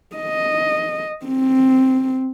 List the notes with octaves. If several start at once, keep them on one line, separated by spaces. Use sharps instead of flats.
D#5
C4